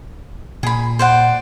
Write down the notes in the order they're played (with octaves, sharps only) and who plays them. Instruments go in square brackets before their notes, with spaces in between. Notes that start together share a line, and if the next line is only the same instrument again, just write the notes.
[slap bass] A#2 [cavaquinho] G#4 B5
[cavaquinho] C5 D5 F#5